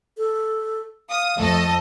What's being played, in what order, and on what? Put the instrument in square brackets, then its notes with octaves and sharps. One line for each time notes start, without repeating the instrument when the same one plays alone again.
[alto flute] A4
[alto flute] F5 [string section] D#6
[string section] F2 A4 D#5 [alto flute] A3